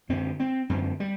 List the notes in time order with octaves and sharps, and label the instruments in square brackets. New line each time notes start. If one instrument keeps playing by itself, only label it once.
[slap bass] F#2 D3 C4
C4
F#2 D3 C4
G3